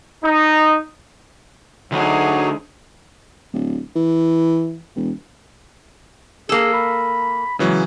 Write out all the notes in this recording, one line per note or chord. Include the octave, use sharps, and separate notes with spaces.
D#4
D2 F#3 D#4 G#4
D1
E3
E1
A#3 G#4 A4
B5
C#3 E3 F#3 G#3